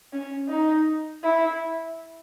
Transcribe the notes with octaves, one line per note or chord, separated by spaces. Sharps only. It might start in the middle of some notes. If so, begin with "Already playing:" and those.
C#4
D#4
E4